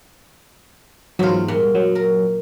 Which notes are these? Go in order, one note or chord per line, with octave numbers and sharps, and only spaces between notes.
E2 G#2 F#3 F4
A#2 G3
F#3
A#4